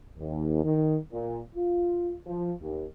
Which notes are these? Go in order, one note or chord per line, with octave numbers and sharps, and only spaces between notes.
D#2
D#3
A#2
F4
F3
D#2